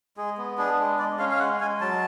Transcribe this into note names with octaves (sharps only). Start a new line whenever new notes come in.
G#3 G#4
B3
D4 G#4
G#3
G#3 D5
C#4 F5
F5
G#3 F#5
G#3 G#5
F#3 A5